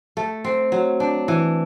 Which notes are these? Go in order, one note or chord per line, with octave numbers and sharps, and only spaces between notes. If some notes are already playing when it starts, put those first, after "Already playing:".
A3
C4
F#3
D4
E3